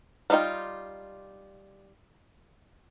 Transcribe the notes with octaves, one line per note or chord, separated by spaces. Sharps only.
G3 D4 D#4 F4 G5